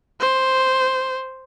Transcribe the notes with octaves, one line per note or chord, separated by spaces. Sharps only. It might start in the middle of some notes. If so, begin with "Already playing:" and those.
C5